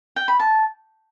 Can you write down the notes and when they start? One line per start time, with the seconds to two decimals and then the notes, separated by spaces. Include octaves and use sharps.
0.16 G5
0.28 B5
0.40 A5